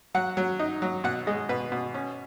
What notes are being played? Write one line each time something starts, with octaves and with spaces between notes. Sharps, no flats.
F#3 F#5
F#3
D#4
F#3
B2 F#5
G#3 D#5
B2 B4
B2
C#4